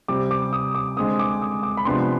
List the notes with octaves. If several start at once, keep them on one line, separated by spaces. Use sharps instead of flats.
C3 G3 C4 D6
D6
D#6
D6
D3 G#3 C4 D#6
D6
D#6
D6
B5
C3 F3 G#3 B3 D4 C6